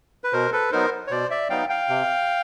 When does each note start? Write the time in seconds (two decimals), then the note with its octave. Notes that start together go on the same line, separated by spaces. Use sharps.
0.24 B4
0.33 B2 A#4 C5
0.52 A4 B4
0.72 F#3 B3 D#4 A#4 C5
1.07 C#5
1.11 B2 C5 D5
1.30 D5 E5
1.50 F#3 B3 D#4 F5 G5
1.69 F5 G5
1.89 C3